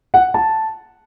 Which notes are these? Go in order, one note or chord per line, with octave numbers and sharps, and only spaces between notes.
F#5
A5